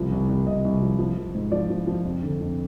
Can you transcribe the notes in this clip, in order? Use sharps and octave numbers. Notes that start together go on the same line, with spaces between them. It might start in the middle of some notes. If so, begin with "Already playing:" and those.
Already playing: C2 F3
C2
C2
C2 D#5
C2
F3
F3
F3
G#2
F3 D5
F3
F3
F2
D3
F2